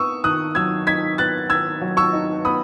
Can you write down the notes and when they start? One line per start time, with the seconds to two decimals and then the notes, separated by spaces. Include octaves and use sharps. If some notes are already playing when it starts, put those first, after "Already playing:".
Already playing: B3 D#4 C#6 D#6 E6
0.24 D#3 D#6 F#6
0.55 F#3 E6 G#6
0.87 D#4 G#6 B6
1.18 B3 F#6 A6
1.50 D#3 E6 G#6
1.81 F#3
1.97 C#6 E6
2.13 D#4
2.45 B3 B5 D#6